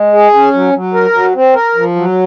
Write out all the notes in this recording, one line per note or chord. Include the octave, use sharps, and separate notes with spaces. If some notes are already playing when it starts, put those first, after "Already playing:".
Already playing: G#3
G#4
C#4
F#3
F#3
A#4
F#3
C4
A#4
F3
F#3